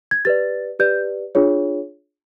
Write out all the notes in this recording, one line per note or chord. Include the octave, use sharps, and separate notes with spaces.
G#6
G4 B4 D5 A6
G4 B4 D5 G6
D4 F4 G#4 C#5